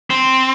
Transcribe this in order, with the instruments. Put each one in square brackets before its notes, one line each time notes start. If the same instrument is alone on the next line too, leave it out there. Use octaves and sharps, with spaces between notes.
[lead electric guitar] C4